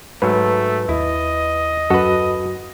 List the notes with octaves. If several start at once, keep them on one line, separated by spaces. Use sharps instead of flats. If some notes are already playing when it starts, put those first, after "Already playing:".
G#2 F#3 A3 B4
D#2 E4 D#5
F#2 F#4 A4 B4